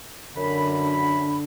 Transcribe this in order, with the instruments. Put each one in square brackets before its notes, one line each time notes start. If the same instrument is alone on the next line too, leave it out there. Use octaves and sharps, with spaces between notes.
[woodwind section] F#2 B5 [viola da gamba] D3